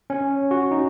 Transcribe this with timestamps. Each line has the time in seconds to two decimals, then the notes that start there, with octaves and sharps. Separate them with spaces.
0.10 C#4
0.51 F#4
0.71 D#4